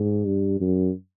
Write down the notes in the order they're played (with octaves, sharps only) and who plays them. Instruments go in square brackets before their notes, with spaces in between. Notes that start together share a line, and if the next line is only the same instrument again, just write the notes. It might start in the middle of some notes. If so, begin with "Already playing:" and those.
Already playing: [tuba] G#2
G2
F#2